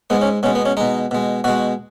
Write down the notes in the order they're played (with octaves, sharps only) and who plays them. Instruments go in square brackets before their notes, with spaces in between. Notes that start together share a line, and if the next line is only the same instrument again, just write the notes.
[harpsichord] G#2 G#3 B3
C#4
B2 G#3 C#4
B3
C#4
B2 G#3 D#4
B2 G#3
B2 G#3 F#4